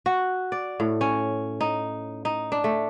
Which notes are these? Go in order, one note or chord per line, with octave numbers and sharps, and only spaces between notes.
F#4
D5
A2
C#4
D#4
D#4
D4
A3